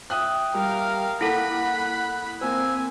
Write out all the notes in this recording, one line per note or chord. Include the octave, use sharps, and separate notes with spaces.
E5 G5 D#6 F#6
G3 A#4 F5
A#3 E4 A4 F#5 B5 F#6
A#3 C4 G#5 E6